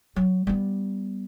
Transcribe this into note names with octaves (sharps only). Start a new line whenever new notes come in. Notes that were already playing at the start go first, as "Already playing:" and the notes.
F#3
G3 B3